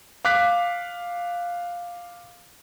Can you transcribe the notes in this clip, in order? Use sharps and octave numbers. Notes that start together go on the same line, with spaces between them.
F5 D6 F#6 B6